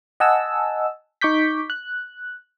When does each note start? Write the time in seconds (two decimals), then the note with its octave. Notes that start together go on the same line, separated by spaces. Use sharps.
0.20 D#5 F#5 G#5 A5 E6
1.21 D#4 C#6 D6 G6 B6
1.70 F#6